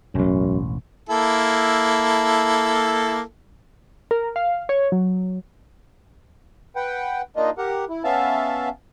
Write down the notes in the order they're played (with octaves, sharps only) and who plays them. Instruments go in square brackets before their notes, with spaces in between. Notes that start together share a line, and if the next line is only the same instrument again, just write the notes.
[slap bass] E1 A1 [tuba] F#2
[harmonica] A#3 E4 A4
[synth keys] A#4
F5
C#5
F#3
[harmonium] B4 F#5 G5
A#3 D4 D#4 F4 D#5
G4 A#4 F#5
E4
B3 C#4 E5 F5 A5